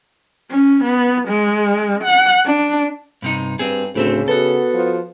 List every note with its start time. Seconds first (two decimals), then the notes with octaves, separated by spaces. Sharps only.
0.51 C#4
0.84 B3
1.28 G#3
2.04 F#5
2.46 D4
3.22 G2 C3 D#4
3.59 G2 C4 G#4
3.95 D2 A2 C#3 A3 C4
4.28 B3 F#4 A4
4.74 F3